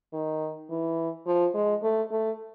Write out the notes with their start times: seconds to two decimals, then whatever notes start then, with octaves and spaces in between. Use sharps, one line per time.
0.13 D#3
0.70 E3
1.26 F3
1.54 G#3
1.83 A3
2.11 A3